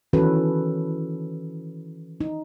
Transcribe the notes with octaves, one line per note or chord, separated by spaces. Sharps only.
D#3 E3 C#4 F#4 A4 B4
D#4